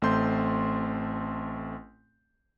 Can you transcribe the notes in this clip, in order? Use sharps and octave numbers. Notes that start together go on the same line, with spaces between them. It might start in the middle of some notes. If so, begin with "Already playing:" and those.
A1 A3 C4 C6 G6